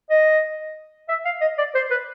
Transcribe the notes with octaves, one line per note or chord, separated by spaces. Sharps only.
D#5
E5
F5
D#5
D5
C5
B4